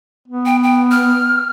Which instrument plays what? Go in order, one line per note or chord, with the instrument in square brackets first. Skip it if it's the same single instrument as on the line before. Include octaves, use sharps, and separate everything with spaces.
[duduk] B3
[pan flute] G5
G5
F6